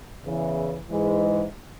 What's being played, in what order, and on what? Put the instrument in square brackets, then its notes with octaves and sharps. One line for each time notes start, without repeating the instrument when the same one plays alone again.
[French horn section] E2 C#3 E3
G#2 E3 G#3